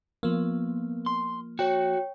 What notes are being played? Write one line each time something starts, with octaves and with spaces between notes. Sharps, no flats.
F3 A#3 B3
C6
F#4 C#5 G5